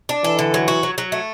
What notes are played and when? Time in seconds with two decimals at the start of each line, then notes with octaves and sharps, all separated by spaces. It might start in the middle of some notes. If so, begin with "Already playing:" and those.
0.09 D4
0.24 E3 A4
0.39 D3
0.54 F#3
0.68 F#4
0.83 F#3
0.98 F#3
1.12 A3